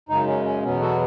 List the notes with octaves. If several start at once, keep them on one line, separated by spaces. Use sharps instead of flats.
F#2 C#3 G#3 D#4
C#4
C#4
E2 B2 F#3 B3 C#4
F#4 A4